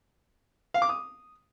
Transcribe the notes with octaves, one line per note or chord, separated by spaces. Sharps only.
F5
D6
D#6